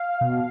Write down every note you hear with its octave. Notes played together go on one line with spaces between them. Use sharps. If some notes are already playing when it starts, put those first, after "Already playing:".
Already playing: F5
B2